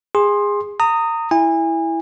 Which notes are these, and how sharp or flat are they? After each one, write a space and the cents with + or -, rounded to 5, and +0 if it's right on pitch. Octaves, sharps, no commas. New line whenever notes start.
G#4 -20 C6 +15
A#5 -30 D#6 +0
E4 +0 G#5 -30